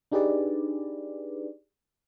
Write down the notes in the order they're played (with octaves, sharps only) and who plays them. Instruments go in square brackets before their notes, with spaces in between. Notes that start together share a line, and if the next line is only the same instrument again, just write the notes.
[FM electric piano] D4 D#4 G4 G#4 B4 D5